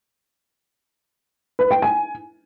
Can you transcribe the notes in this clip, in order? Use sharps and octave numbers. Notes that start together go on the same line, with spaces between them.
B4
G5
G#5